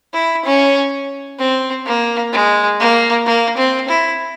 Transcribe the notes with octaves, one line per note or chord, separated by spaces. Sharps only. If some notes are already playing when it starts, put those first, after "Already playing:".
E4
C#4
C4
A#3
G#3
A#3
A#3
C4
E4